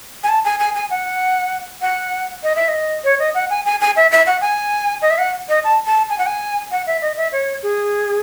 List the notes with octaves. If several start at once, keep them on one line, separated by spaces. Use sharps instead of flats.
G#5
A5
G#5
G#5
G#5
F#5
F#5
D#5
E5
D#5
C#5
D#5
F#5
G#5
G#5
G#5
E5
E5
F#5
G#5
D#5
E5
F#5
D#5
A5
A5
G#5
F#5
G#5
F#5
E5
D#5
E5
C#5
G#4